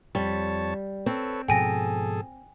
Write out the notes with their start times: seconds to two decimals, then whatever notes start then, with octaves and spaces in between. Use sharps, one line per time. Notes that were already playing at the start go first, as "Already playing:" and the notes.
0.15 F2 G3 C#5 A5
1.06 C4 A4 B4 C#5
1.48 G#2 B2 F3 G#4 A4 G5 G#5 A#6